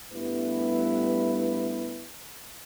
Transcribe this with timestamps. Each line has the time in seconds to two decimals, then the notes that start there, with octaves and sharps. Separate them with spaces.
0.12 G2 G3 A3 B3 E4 B4